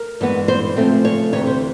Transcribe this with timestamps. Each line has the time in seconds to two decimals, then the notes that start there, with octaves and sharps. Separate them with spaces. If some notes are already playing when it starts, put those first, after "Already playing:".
Already playing: A#4
0.20 G2 E3 G#3 B3
0.48 C5
0.76 C#3 F3 A3 C4
1.05 C#5
1.33 D2 C3 E3 C#5
1.47 C5